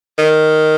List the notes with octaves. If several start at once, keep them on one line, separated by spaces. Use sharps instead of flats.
D#3